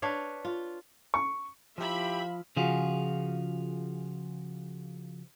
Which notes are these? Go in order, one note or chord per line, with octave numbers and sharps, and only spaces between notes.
D4 B4 C#5 F5
F4
C#6
F3 E4 G4 E5 F5 B5
C#3 F3 F4 F#4 G#4